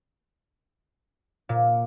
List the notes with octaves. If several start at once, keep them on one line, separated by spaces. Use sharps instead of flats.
A#2